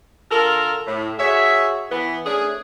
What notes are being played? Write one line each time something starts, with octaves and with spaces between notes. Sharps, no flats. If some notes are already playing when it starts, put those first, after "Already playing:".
D3 F4 A4 A#4
A2
F#4 G#4 C#5 E5
E3 B3
A3 C#4 D4 G#4